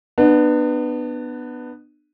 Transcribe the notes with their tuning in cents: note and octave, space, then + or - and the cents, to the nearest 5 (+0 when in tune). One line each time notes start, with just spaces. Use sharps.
B3 +0 D4 +35